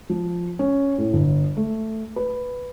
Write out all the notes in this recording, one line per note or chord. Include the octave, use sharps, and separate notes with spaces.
F3
C#4
A2
G1
A3
B4